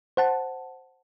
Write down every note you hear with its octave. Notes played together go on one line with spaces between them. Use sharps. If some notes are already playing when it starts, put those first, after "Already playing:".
C5 F#5 A5